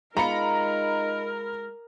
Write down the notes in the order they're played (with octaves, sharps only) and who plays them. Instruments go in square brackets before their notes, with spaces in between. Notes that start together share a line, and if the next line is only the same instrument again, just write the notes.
[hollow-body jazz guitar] G#3 F4 [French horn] D#4 [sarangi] A#4 [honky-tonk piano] A#5 B5 C#7